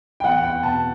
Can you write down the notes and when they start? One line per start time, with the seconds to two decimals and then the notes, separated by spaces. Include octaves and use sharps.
0.20 G5
0.24 E2 F#5
0.44 G5
0.63 B2 A5